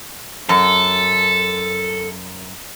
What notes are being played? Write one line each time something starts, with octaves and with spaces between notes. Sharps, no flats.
F#2 A4